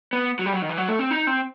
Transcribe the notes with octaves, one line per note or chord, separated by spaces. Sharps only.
B3
F#3
G3
F#3
D#3
E3
F#3
A3
C4
D#4
C4